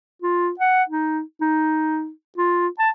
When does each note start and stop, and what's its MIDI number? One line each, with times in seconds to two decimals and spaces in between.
0.22 0.51 65
0.59 0.83 78
0.89 1.21 63
1.41 2.11 63
2.37 2.67 65
2.79 2.90 81